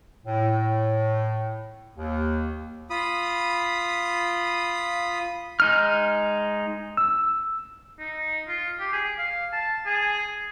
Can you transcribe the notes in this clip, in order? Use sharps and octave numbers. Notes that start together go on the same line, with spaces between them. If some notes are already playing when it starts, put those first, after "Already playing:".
A2
D#2
F4 B5 D#6
G#3 D#4 F6
E6
D#4
F4
G4
G#4
F5
A5
G#4